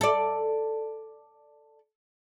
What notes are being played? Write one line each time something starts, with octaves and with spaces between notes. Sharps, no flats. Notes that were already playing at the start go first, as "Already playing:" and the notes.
A4 D5